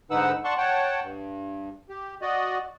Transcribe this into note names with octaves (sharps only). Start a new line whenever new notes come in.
G#2 D3 D#4 B4 F#5 E6
D5 F#5 A5 C6 C#6
C#5 F#5 G5 A5
G2
G4
F#4 D5 D#5